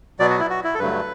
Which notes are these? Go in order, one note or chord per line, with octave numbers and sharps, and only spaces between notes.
B2 F#3 B3 D5
F#4
E4
F#4
E4
A4
G2 D3 F#3 A3 B4